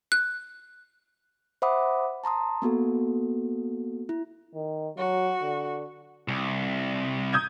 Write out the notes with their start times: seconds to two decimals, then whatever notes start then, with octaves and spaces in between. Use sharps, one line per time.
0.12 F#6
1.62 C5 E5 F#5 B5 D6 D#6
2.24 A5 A#5 C6 D#6
2.62 A#3 B3 F#4 A4
4.09 E4
4.54 D#3
4.98 F#3 F#4
5.42 D3
6.28 C2
7.33 D#6 G6 G#6